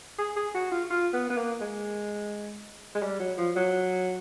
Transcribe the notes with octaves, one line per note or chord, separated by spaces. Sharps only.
G#4
G#4
F#4
F4
F4
B3
B3
A#3
G#3
G#3
G3
F#3
F3
F#3